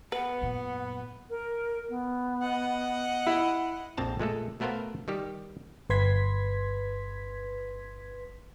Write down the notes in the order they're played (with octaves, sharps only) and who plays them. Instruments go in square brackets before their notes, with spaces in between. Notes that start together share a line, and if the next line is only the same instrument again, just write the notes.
[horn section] B3 [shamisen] B4 [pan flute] F#5
[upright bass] F#2 A#2
[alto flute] A#4
B3
[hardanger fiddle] D#5 F#5
[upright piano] E4
[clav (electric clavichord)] A#1 F2 C4 A5 A#5
A#2 G#3 A3 A4
B2 A3 B3 A#4 C5 F5
D#3 G3 G4
[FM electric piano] G1 B4 C6 G#6 B6